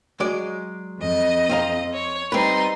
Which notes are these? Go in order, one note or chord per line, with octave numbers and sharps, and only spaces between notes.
F#3 G#3 D5
F2 D#5
C4 F5 A#5
C#5
G3 C4 D#4 B4 C6